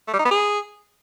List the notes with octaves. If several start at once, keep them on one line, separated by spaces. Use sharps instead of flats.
A3
G3
D#4
B3
G#4